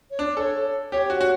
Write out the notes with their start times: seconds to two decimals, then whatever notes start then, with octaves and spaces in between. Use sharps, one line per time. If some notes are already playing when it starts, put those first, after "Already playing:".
0.10 C#5
0.19 D4 D5
0.37 A4 C#5
0.91 G4 C#5
1.10 F#4
1.21 F#4